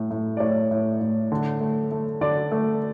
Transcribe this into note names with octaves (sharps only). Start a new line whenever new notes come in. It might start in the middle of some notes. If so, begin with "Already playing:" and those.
Already playing: A2
A2
D5
A2 C#5
A2
A2
D3
A3
A3
D3 D5
A3